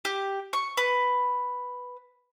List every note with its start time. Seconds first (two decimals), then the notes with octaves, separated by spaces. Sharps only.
0.05 G4
0.53 C#6
0.77 B4